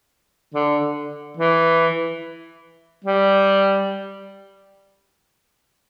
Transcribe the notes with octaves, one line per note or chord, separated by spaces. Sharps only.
D3
E3
G3